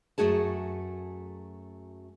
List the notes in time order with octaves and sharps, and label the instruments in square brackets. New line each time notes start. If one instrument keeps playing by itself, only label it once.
[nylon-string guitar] F#2 B2 A3 F#4 G#4 A5